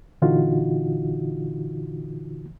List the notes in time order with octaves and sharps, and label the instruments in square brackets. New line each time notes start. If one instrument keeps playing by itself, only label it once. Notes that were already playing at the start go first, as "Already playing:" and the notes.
[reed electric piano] A#2 D3 E3 D#4 F4 F#4